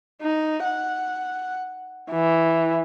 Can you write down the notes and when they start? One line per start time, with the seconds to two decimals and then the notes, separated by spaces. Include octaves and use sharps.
0.22 D#4
0.64 F#5
2.11 E3